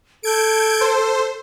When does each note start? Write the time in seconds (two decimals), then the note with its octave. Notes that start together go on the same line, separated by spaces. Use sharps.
0.23 A4 G6 G#6 D7
0.81 C5